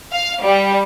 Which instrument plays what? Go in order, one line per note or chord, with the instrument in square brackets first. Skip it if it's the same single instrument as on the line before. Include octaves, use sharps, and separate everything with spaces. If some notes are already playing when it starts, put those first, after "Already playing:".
[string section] F5
G3